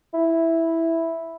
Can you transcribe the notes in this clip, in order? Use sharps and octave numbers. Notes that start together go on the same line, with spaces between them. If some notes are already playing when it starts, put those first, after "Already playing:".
E4